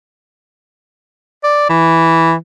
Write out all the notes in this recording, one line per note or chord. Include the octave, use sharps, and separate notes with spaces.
D5
E3